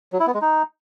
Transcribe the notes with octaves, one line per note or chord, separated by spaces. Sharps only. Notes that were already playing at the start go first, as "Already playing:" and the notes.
F#3
E4
B3
G#3
D#4